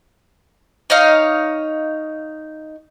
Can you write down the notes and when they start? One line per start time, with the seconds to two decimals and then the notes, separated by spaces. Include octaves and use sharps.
0.90 D#4 C#5 D#5 F5